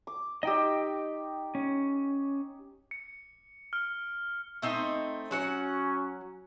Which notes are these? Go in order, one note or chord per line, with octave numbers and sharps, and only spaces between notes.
D6
D#4 G4 D#5 G5 E6
C#4
C#7
F6
A3 C4 D#4
F#3 C#4 F#4 F#5